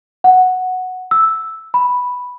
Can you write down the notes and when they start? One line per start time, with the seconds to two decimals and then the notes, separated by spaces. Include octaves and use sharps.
0.24 F#5
1.11 E6
1.74 B5